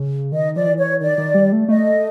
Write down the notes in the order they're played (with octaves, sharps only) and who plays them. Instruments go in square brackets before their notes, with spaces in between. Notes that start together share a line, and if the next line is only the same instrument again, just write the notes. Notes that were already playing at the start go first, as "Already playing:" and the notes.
Already playing: [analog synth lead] C#3
[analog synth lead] D#3 [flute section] D#5
[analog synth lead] F3 [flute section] D5
[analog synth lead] E3
[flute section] C#5
[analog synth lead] D#3 [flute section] D5
[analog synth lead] D#3
G3
A3
[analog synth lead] A3 [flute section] D#5